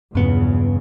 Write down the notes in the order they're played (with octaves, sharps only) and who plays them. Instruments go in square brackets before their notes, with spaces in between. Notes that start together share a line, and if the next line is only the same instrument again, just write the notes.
[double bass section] A#1 E2 C#3 [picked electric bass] G2 B3